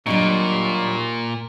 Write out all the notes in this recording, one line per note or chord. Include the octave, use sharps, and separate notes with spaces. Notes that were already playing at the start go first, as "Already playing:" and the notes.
D#2 A#2 F#3 G3 D4 D#4 C#6